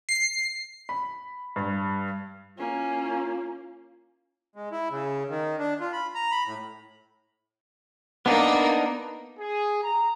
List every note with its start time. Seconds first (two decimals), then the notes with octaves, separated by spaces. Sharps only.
0.09 C7
0.89 B5
1.56 G2
2.58 A#3 C#4 E4 F4
4.56 G#3
4.72 E4
4.90 C#3
5.29 D#3
5.59 D4
5.80 F4
5.92 B5
6.15 A#5
6.31 B5
6.46 A2
8.26 A#3 B3 D4 D#4
9.39 G#4
9.82 A#5